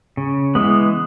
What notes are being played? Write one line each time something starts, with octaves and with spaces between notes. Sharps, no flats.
C#3
E3 G#3 B3